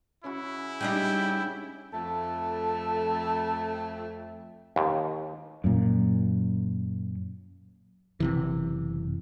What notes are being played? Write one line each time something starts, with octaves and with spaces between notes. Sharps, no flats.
C#3 C#4 E4 F#4
G3 D4 D#4 G5
F2 A3 A4
D#2
F#2 A#2
F#1 C3 E3